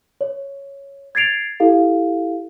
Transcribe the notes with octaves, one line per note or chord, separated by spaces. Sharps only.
C#5
G#6 A6 C7 D7 F7
E4 G4 A4 F5